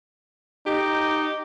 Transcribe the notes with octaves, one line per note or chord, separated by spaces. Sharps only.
D#4 G4